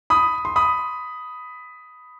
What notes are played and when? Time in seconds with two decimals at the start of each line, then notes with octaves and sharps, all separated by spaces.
0.10 B5 D#6
0.45 C6
0.56 B5 D#6